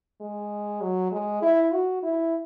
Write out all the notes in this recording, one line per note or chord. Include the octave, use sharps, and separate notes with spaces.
G#3
F#3
G#3
E4
F#4
E4